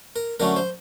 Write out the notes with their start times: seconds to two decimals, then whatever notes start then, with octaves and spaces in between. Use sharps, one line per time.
0.16 A#4
0.40 D3 F#3 A3 C#4 A#4
0.56 C5